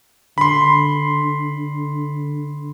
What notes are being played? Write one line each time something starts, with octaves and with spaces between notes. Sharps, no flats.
D3 B5 C6